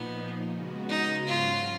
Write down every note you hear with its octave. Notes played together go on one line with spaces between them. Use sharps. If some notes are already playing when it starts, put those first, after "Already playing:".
Already playing: A#2 F3 A#3 B3 D#4
C#3 G#3 B3 F#4
D#4
G#2 F#3 C#4 F4 F#4